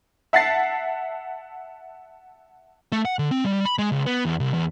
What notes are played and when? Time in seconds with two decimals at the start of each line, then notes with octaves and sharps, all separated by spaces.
0.33 E5 F#5 A5 A6 C7
2.92 A3
3.05 F#5
3.19 D3
3.31 C4
3.45 G3
3.65 B5
3.78 G#3
3.92 C#2
4.06 B3
4.25 E2
4.40 C2
4.54 E2